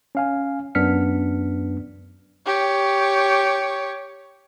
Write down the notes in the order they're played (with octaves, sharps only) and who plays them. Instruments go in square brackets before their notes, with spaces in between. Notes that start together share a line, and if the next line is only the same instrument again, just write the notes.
[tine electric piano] C#4 F5 G#5
F#2 B3 D4 F6 B6 C#7
[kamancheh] G4 C#5